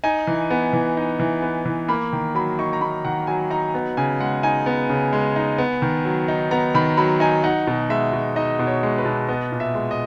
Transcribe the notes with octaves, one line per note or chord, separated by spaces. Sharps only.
D#4 G#5
E3
B3
E3
D#4
E3
B3
E3
A#3 B5
D#3
F#3 B5
D#4 C#6
A#5
A#3 B5
D#3 F#5
F#3 G#5
D#4 A#5
B3
C#3 G#5
G#3 F#5
D#4 G#5
B3
C#3
G#3
D#4
B3
D#3
F#3
D#4
B3 A#5
D#3 B5
F#3 B5
D#4 G#5
D#4 F#5
B2
G#3 E5
B2
D#4 D#5
B2
C#5
G#3
B4
B2
B3 D#5
A#2
E5
G#3
D#5